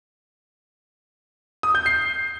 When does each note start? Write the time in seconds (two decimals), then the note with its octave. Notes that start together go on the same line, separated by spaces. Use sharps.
1.63 D#6
1.75 G6
1.86 C7